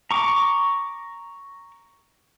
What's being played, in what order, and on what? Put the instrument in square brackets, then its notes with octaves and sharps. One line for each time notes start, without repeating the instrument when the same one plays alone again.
[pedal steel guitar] A#5 C#6 D6